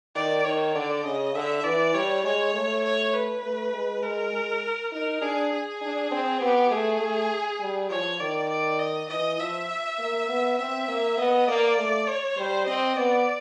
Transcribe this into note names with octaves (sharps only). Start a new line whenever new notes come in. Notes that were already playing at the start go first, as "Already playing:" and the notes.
D#3 D5
D#3 C#5
D3 D5
C#3 D#5
D3 E5
E3 D5
G3 C#5
G#3 C#5
A3
C#5
B4
A3
G#3
G#3 A#4
G#3
D#4 A#4
D4 G#4
G#4
D4
C4
B3 G4
A3 G#4
A3
G3
F3 C#5
D#3 D5
D5
D#5
E3 D#5
F3 E5
A#3
B3
C4 E5
A#3
B3 D#5
A#3 D5
A3
C#5
G3 C5
C4 D#5
B3 D5